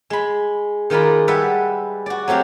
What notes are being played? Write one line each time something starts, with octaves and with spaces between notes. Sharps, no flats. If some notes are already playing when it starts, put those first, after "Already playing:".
G#3 B5
D#3 G#3 F4 A#4 D5 B5
G3 G#3 B4 E5 F#5 A5
F#4 D5
F#3 A3 C4 G4 F5